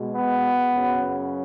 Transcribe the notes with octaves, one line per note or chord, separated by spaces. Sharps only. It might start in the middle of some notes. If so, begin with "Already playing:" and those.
Already playing: B2 G#3
B3
F#2 C#3 F#3